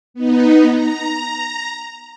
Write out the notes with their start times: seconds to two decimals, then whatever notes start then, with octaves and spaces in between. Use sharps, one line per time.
0.14 B3 D#4
0.71 A#5